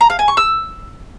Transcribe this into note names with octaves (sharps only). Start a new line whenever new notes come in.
A#5
F5
G#5
C#6
E6